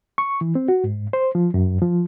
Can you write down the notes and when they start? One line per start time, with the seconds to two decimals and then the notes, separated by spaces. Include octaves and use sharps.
0.18 C#6
0.41 E3
0.55 C4
0.68 F#4
0.84 G#2
1.13 C5
1.35 F3
1.54 F#2
1.82 F3